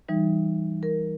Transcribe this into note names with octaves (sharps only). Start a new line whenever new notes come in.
E3 G3 D#4
A#4